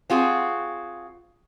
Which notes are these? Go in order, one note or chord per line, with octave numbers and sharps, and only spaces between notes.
C4 F4 F#4 G#4